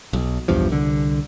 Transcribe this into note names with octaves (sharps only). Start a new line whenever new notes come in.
B1
B1 E2 G2 F3
C2 D3